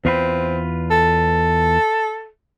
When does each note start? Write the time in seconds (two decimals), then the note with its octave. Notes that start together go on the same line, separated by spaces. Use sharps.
0.05 E2 C4 F4 B4
0.91 A4